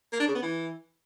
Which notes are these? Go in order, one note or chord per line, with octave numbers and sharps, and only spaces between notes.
A#3
D4
C#3
B3
E3